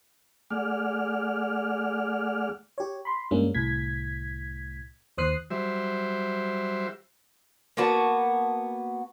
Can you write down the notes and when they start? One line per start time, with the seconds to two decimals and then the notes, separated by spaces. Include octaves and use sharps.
0.50 A3 G#4 D5 F#5 F6
2.78 G4 C#5
3.05 B5 C6
3.31 G2 G3 G#3 A#3 C#4
3.54 C2 A2 G#6 B6
5.18 D#2 C5 D#6 F#6 C7
5.51 F#3 G3 C5 E5
7.77 A#3 B3 F#4 A5